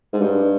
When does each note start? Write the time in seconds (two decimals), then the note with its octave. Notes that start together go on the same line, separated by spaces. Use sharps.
0.13 G#2
0.21 G2